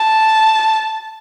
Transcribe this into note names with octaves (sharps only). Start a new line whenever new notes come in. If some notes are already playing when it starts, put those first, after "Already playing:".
Already playing: A5